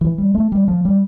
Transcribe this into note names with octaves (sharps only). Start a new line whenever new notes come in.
E3
G3
A3
G3
F3
G3